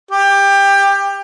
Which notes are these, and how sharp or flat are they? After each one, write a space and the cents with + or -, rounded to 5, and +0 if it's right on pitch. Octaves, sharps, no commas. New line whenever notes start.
G4 +20